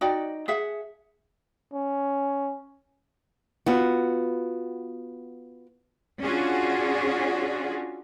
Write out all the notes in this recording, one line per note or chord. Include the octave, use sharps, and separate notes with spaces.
D#4 F#4 D5 G5
G#4 E5 F#5
C#4
B3 F4 F#4
C#4 D4 F4 F#4 G#4 D5